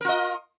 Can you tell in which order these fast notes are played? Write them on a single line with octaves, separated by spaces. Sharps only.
A#4 F4 D#5